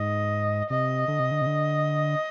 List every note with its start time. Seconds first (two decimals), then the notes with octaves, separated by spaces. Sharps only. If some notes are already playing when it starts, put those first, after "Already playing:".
Already playing: G#2 D#5
0.70 C3 D#5
1.08 D3
1.19 C3
1.31 D3
1.41 C3
1.46 D3